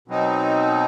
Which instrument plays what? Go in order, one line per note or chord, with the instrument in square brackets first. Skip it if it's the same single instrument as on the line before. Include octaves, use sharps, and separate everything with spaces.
[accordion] B2 F#3 C4 D#4